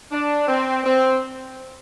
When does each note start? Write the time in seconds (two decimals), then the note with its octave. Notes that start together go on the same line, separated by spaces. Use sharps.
0.12 D4
0.48 C4
0.83 C4